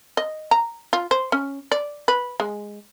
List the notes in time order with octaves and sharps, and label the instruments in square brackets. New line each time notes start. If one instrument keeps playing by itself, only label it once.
[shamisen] D#5
A#5
F4
C5
C#4
D5
B4
G#3